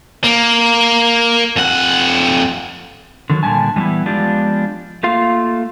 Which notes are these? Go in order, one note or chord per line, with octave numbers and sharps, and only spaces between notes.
A#3
F2 F#5
D3 D#3 F#3
A#2 D3 G3 G#5 A5
E3 G3 G#3 B3 E4
F3 G#3 B3 D4 F4 G4
A3 A#3 F4 F5